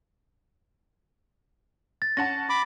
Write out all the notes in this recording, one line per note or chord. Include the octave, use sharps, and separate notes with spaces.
A6
C#4 F#5 A5 A#6
B5 D6